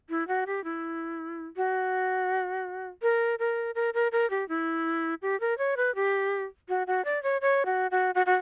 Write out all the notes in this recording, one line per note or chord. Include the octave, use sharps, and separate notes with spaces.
E4
F#4
G4
E4
F#4
A#4
A#4
A#4
A#4
A#4
G4
E4
G4
A#4
C#5
B4
G4
F#4
F#4
D5
C#5
C#5
F#4
F#4
F#4
F#4